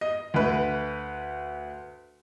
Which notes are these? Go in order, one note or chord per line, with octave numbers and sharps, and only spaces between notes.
D#5
D2 B4